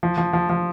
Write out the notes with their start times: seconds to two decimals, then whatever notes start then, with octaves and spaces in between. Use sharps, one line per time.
0.03 F3
0.18 F3
0.33 F3
0.49 F3